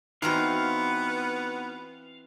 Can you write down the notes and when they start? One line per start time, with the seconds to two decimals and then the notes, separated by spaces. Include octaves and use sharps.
0.22 E3 B3 C4 D#4 F#4 F5 A#5